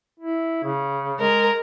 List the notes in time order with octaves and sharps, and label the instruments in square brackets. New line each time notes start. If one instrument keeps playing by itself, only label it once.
[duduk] E4
C#3
[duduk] G#3 [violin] A#4